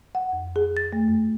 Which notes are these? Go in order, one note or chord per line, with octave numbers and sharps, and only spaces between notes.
F#5
F2
G#4
A6
A3
F#2